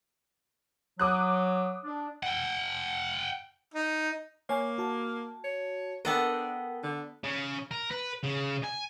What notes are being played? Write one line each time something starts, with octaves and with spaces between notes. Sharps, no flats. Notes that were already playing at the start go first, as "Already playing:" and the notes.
F#3 D6 D#6 F#6
D4
F#5 G5
D#4
A#3 C#5 G#5
F#4 A5
C#5
B3 D4 A4 A#4 D#5 F#5 G5
D3
C#3
A#4
B4
C#3
G#5